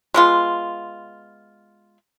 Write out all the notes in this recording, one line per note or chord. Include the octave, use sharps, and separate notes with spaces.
G#3 B3 F4